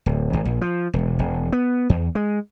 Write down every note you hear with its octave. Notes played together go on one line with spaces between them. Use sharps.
D1
G#1
A#1
F3
E1
E1
B3
E2
G#3